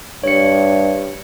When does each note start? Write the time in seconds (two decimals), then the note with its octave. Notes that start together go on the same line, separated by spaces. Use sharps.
0.23 G2 C#5 C#7